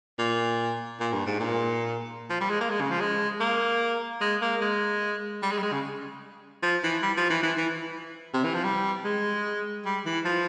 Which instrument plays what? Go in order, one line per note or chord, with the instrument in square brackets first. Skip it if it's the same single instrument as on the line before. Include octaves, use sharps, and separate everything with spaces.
[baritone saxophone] A#2
A#2
G2
G#2
A#2
F3
G3
G#3
A#3
G#3
C#3
F3
G#3
A#3
G#3
A#3
G#3
G3
G#3
G3
G#3
C#3
F3
E3
G3
F3
E3
E3
E3
C3
E3
F3
G3
G#3
G3
E3
F3